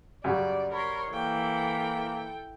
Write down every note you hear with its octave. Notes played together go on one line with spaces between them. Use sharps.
F#2 C#3 G3 D5
A#4 C#5 B5 C6
E3 A#3 A4 G5